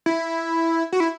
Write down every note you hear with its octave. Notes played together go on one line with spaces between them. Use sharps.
E4
F#4
E4